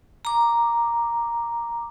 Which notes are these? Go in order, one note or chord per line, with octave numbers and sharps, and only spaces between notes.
A#5 D6